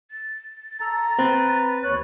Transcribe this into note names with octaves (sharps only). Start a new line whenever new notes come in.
A6
A4 A#5
C4 B4
D#2 C#5 F#6